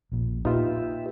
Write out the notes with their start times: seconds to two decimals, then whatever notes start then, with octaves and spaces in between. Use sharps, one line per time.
0.12 A#1 A#2
0.45 A#2 D#4 F4 G4 B4 E5